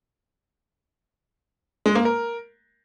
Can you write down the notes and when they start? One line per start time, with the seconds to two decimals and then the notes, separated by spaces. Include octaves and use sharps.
1.86 G#3
1.95 A#3
2.05 A#4